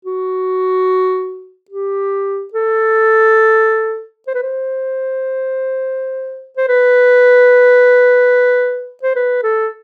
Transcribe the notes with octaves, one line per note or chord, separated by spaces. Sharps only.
F#4
G4
A4
C5
B4
C5
C5
B4
C5
B4
A4